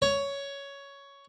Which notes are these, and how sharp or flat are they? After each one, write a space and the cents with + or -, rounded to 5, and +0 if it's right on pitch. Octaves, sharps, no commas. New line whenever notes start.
C#5 +10